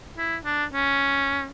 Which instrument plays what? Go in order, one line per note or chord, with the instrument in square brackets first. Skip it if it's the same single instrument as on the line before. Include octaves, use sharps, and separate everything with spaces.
[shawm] E4
D4
C#4